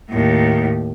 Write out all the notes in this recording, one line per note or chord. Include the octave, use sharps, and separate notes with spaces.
D#2 A2